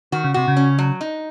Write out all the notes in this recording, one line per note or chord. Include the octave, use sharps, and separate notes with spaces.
D#3 F#4
C#3
C3 F#4
C#3
C#4
F#3
D#4